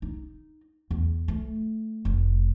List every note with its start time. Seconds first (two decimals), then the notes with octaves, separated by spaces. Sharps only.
0.02 D#4
0.91 E2
1.28 A3
2.05 F1